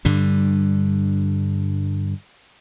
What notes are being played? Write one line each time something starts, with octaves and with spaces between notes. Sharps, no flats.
G2 D3 G3